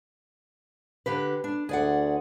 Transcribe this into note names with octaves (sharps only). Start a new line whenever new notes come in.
D3 G4 B4
D4
D2 D3 G#4 D5 F#5